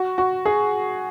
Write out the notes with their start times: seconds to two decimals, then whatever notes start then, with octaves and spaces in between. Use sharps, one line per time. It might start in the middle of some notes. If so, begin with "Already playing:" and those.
Already playing: F#4
0.18 F#4
0.46 G#4